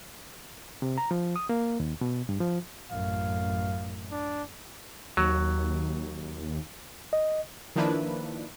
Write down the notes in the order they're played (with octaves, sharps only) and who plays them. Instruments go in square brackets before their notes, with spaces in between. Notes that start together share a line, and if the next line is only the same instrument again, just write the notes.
[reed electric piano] C3
A#5
F3
D#6
A#3
D#2
B2
G2
F3
[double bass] A1 F#2 [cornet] F5
[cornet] D4
[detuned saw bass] D#2 [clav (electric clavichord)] F#3
[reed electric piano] D#5
[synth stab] D#3 F3 A#3 D4 E4 B4